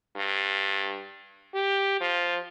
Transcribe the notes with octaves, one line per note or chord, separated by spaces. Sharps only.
G2
G4
F3